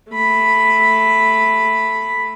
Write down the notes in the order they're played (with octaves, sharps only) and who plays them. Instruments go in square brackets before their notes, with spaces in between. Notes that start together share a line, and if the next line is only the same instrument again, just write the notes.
[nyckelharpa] A3 B5